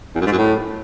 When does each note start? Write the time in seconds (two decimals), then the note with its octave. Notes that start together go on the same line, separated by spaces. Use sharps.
0.15 E2
0.21 F#2
0.26 G#2
0.32 F#2
0.38 A2